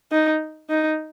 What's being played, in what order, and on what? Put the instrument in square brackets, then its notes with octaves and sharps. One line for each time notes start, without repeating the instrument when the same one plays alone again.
[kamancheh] D#4
D#4